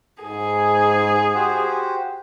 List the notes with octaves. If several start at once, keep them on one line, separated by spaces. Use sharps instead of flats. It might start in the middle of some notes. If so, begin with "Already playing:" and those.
G#2 G#4
F#4 G4 C5